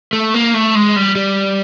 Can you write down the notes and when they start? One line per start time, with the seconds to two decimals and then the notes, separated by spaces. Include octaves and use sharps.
0.13 A3
0.34 A#3
0.54 A3
0.75 G#3
0.96 G3
1.16 G3